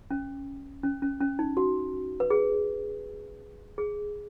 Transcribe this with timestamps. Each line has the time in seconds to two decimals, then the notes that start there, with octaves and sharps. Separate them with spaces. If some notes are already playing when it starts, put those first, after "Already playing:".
0.11 C#4
0.83 C#4
1.02 C#4
1.21 C#4
1.39 D#4
1.57 F#4
2.20 B4
2.30 G#4
3.78 G#4